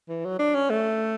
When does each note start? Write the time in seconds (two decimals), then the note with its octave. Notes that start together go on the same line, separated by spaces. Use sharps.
0.09 E3
0.25 F#3
0.39 D4
0.55 C#4
0.70 A3